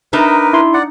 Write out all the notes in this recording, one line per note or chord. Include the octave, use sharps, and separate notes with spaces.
D4 D#4 A#4 B4 E5
E4 C6
D5 F#5